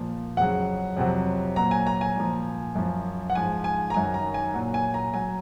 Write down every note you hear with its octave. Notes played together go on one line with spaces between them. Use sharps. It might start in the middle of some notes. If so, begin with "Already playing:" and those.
Already playing: A#2 F3
F2 C#3 F#3 F#5
F2 C3 F#3
A#2 F#3 A#5
G#5
A#5
G#5
A#2 F3
F#2 F3
F#5
G#2 F3 G#5
G#5
A#5
F#2 D#3 F#3 G#5
A#5
G#5
A#2 F#3
G#5
A#5
F#3 G#5